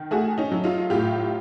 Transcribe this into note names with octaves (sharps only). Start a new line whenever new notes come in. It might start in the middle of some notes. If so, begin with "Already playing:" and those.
Already playing: D#3
A3 F#4 G#4
C#4 D#4
F#3
D#4 F4
A2 F4 G4